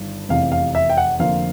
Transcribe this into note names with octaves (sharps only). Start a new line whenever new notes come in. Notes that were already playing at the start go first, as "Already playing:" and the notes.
Already playing: G1 G2 D#3
F1 E2 C3 F5
F5
E5
G5
F#5
F1 F2 D3 F3 A#3 F5